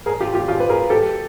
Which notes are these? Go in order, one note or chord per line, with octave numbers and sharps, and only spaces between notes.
G#4 A#4
F4 G4
F4 G4
F4 G4
B4
G#4 A#4
G4 A4